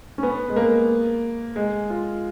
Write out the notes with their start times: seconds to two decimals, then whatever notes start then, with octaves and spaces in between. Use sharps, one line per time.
0.18 C#4
0.23 B3
0.49 G#3
0.56 A#3
1.56 G#3
1.90 F4